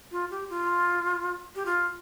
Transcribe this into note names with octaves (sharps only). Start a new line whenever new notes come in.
F4
G4
F4
G4
F4